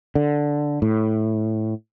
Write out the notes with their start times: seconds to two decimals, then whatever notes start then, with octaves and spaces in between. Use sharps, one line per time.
0.15 D3
0.82 A2